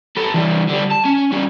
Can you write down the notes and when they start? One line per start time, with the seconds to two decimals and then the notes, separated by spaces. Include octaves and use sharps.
0.17 A4 B4
0.34 E3 G3
0.69 D3 G3
0.91 A5
1.05 C#4
1.32 G3 C#4